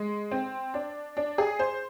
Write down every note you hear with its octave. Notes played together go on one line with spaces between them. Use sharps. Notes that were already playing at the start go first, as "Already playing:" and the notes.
Already playing: G#3
C4
D4
D4
G#4
C5